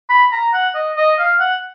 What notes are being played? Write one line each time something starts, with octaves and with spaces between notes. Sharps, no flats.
B5
A#5
F#5
D#5
D#5
F5
F#5